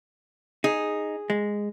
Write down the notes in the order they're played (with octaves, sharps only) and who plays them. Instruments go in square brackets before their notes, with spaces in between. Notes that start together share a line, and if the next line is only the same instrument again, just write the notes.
[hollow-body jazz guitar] D#4 [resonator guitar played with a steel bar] G#4
[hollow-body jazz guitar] G#3